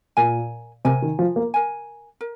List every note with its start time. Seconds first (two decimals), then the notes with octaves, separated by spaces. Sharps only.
0.17 A#2 A#4 G#5
0.85 C3 A#4 G#5
1.02 D#3
1.19 F3
1.36 A#3
1.54 A#4 G#5
2.21 A#4